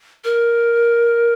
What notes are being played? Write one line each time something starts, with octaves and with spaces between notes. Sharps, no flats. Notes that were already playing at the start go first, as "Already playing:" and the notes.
A#4